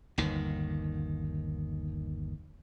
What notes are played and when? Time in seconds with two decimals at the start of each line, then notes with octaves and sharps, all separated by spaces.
0.18 G1 D#2 D#3